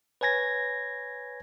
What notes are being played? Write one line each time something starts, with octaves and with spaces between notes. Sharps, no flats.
B4 C#5 G#5 G#6 A#6